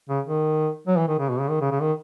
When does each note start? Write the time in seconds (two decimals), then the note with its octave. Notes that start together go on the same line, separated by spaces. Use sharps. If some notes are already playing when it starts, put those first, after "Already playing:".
0.09 C#3
0.25 D#3
0.87 F#3
0.98 E3
1.08 D#3
1.19 C#3
1.29 B2
1.40 C#3
1.50 D#3
1.61 C#3
1.71 C#3
1.81 D#3